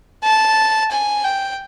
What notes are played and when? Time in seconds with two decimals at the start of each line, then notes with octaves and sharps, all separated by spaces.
0.24 A5
0.91 G#5
1.24 G5